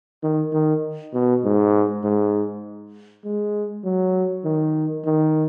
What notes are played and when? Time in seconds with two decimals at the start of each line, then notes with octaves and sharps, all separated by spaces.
0.23 D#3
0.53 D#3
1.14 B2
1.44 G#2
2.04 G#2
3.24 G#3
3.84 F#3
4.44 D#3
5.05 D#3